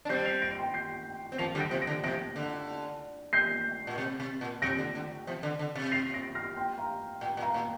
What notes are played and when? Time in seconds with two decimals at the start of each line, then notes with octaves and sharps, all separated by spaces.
0.05 D4
0.09 G3 C4 G6 C7
0.25 C7 F7
0.42 A#6 D7
0.58 G5 C6
0.74 G6 C7
1.32 C4
1.38 F3 A#3 C7 F7
1.55 D3 G3
1.60 A#6 D7
1.71 C3 F3
1.82 A#6 D7
1.87 D3
2.04 C3 F3 A#6 D7
2.36 D3
3.33 G6 C7
3.87 A#2
3.98 C3
4.20 C3
4.41 A#2
4.62 C3 A#6 D7
4.78 D3
4.95 D3
5.27 C3 F3
5.43 D3
5.59 D3
5.75 C3
5.92 C7 F7
6.13 A#6 D7
6.35 F6 A#6
6.56 G5 C6
6.78 F5 A#5
7.21 A#2 G5
7.37 A#2
7.42 F5 A#5
7.54 A#2